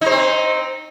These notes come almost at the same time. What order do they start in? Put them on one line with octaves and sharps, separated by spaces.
D#4 C5 C4